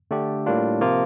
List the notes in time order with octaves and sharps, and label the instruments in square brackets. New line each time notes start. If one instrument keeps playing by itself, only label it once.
[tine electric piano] D3 A3 D4 G4
A2 G3 A#3 D4 F4
C3 F3 A#3 F4